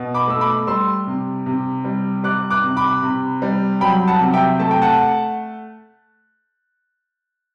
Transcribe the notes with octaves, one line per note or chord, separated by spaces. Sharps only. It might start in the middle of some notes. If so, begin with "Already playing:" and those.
Already playing: B2
B5 D6
A3 E6
B5 D6
G3 C6 E6
C3
C3
G3
G3 D6 F#6
D6 F#6
C3
B5 D6
C3
G3
F#3 G5 B5
F#5 A5
C3
E5 G5
A3 A5
G5
F#5 A5